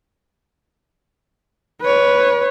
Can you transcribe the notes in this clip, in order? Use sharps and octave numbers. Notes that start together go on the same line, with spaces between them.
B4 C#5